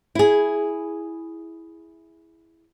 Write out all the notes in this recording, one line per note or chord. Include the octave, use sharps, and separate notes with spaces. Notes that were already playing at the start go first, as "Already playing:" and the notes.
E4 G#4